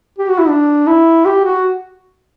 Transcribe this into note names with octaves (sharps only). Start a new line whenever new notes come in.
G4
F#4
E4
D4
E4
G4
F#4